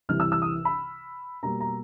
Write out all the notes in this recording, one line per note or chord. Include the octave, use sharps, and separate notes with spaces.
C2 C3 E3 F6
E6
E6
D#6
B5
B2 G3 A#3 A#5
A#5